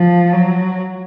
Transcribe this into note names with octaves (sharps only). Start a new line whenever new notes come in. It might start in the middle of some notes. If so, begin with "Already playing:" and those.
Already playing: F3
F#3